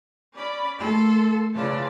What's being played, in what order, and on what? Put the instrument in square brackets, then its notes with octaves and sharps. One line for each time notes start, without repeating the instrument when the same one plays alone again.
[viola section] C#4 D5 B5
[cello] A3 A4 [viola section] A#3 C6
[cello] C#3 F4 [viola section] E3 D5 A5